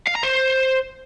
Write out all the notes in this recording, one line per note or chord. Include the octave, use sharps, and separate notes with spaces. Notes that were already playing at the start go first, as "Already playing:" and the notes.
F5
A#5
C5